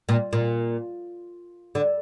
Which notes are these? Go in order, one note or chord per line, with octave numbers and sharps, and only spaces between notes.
A#2
A#2
D3